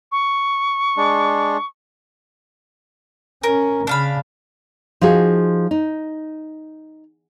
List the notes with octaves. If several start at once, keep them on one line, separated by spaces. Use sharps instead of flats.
C#6
G#3 D4
C#4 A#4
C#3 D4 F5 B5
F3 D#4 F#4 G#4
D#4